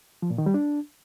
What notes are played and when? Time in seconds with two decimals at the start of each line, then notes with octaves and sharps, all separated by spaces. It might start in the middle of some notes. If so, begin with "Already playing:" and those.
0.22 F3
0.30 A#2
0.38 D#3
0.46 G3
0.54 D4